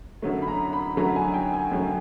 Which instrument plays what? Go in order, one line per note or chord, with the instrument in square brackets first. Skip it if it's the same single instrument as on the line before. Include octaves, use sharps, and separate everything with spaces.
[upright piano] F#2 D3 F#3 A3
B5
A#5
B5
F#2 D3 F#3 A3 A#5
G#5
G5
G#5
F#2 D3 F#3 A3